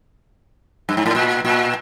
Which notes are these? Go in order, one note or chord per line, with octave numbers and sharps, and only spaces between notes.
G2
G#2
A2
A#2
A#2